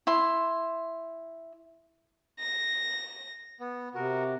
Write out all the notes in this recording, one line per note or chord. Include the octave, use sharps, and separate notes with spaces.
E4 C6
A#6
B3
C3 F#4 A#4